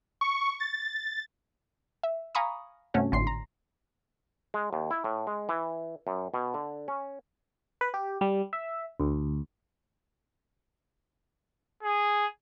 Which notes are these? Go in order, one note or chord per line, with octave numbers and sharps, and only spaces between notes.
C#6
A6
E5
F5 G#5 A#5 B5 C#6 D#6
G2 C3 A3 C#4 F#4
G#1 A2 D3 C6 C7
A#5
G#3
D#2
E4
A2
G#3
E3
F#2
B2
D3
C#4
B4
G4
G3
E5
D2
G#4